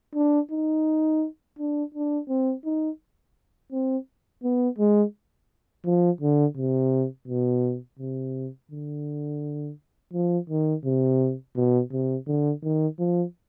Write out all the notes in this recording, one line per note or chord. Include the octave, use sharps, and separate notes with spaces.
D4
D#4
D4
D4
C4
D#4
C4
B3
G#3
F3
D3
C3
B2
C3
D3
F3
D#3
C3
B2
C3
D3
D#3
F3